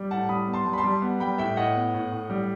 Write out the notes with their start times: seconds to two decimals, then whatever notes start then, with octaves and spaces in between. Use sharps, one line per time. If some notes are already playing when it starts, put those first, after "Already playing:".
Already playing: G3
0.11 A2 F#5 A5
0.29 G3 B5 D#6
0.48 B3
0.53 A5 C6
0.66 G3
0.73 B5
0.78 A5 C6
0.84 G3
1.02 B3
1.20 G3 G5 B5
1.38 A2 E5 G5
1.57 A2 D#5 F#5
1.75 B3
1.94 A2
2.12 A2
2.30 G3